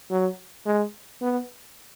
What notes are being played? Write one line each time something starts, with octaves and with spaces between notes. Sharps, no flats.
F#3
G#3
B3